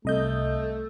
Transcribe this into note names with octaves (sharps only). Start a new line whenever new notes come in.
C2 A3 D#5 G6